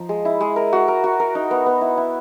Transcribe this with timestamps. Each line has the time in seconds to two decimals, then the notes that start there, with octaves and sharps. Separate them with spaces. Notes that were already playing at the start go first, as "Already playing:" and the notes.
Already playing: F3 D#4
0.09 G#3
0.25 E4
0.41 G#3
0.56 A#4
0.73 F#4
0.88 A#4
1.04 F#4
1.20 A#4
1.35 D#4
1.51 B3
1.66 B3
1.81 E4
1.97 E4